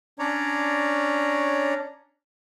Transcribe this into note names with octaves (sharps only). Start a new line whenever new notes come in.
C#4 D4 C#5 D5 A#5